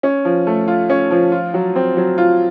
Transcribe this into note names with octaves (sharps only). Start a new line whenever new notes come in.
C#4
F3
A3
F4
C#4
F3
F4
F#3
C4
F#3
F4